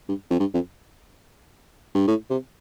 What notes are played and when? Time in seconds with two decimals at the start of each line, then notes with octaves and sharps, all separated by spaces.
0.09 G2
0.30 F2
0.40 G2
0.54 F2
1.95 G2
2.07 A2
2.30 C3